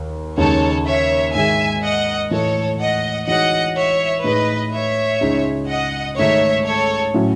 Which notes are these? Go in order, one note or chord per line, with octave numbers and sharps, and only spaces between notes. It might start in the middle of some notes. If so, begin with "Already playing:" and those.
Already playing: D#2
D#2 C#3 G#3 D#4 A4 C#5
C#5 E5
G#2 D#3 G#3 E5 G#5
D#5 F#5
A2 E3 A3 E4 A4 C#5
D#5 F#5
E3 G#3 D#4 F#4 C#5 D#5 F#5
C#5 E5
A2 G#3 D#4 B4 D#5
C#5 E5
C#2 C#3 G#3 D#4
D#5 F#5
G#2 D#3 A3 D#4 G#4 C#5 E5
A4 C#5
A2 F#3 C#4 E4